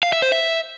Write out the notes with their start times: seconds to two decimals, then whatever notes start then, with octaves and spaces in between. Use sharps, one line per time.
0.03 F5
0.13 E5
0.22 C5
0.32 E5